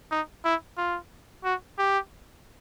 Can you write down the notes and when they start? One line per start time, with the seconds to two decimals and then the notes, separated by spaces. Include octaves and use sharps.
0.11 D#4
0.45 E4
0.78 F4
1.44 F#4
1.78 G4